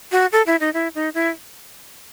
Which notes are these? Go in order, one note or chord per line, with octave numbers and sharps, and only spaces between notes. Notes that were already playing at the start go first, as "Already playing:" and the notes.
F#4
A4
E4
D#4
E4
D#4
E4